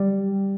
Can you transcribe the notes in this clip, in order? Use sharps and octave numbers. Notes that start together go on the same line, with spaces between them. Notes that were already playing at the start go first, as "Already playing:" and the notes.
Already playing: G3